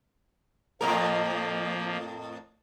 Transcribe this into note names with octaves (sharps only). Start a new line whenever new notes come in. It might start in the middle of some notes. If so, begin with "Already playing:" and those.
F2 A2 F3 A#3 A#4